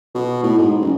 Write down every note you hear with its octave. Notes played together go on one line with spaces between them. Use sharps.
B2
A2
G#2
F#1